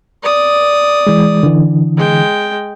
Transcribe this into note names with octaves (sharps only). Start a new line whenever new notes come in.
D5 D#6
E3 G#3
D3 E3
G#3 G5